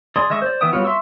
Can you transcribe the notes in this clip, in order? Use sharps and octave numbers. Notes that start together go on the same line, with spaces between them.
G#4 D5 C6
G#3 D#5 E5 C#6
C5 D5
E3 B3 E5 G5 D#6
F#3 G3 B3 F4 C#5
E5 C6 C#6 E6